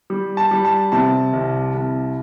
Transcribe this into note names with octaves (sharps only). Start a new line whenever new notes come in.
G3
A5
G3
A5
C3 A5
C2
C2